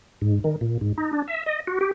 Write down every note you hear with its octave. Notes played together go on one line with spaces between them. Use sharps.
G#2
D#3
A#2
G#2
D#4
D4
E5
D#5
F#4
G4